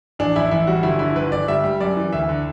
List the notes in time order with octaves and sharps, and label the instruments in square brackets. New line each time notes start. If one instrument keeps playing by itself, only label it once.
[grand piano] A1 D4
A1 E4
A1 E4
G3 F#4
G1 E4
D3 E4
G1 B4
G1 D5
G3 E5
G3
F#2 D5
E3
D2 E5
D3